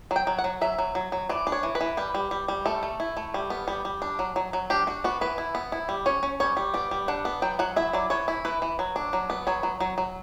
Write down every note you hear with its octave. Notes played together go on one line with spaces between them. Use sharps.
F#3
G5
F#3
F#5
F#3
F#3 E5
F#3
F#3
F#3
E3 D5
D4
C#5
E3
B4
E3
G3 B4
G3
G3
G3
A3 A4
A3
E4
A3
G3
B3
G3
G3
D4
F#3
F#3
F#3
D4 G4
D4 F#4
B3 F#4
E3 B4
E4
B3
E4
G3
C#4 C#5
C#4
G3 C#5
G3
B3 D5
G3
D4 F#5
B3
F#3 G5
F#3 F#5
E4 E5
F#3 D5
E3 C#5
E4
E3 B4
E3
F#3
D4
F#3
B3
F#3 C#5
F#3
F#3
F#3